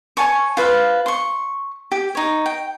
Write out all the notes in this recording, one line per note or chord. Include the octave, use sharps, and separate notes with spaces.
C#5 G#5 A5 C#6
F4 B4 C5 F5
C6 C#6
G4
D#4 C#5
G5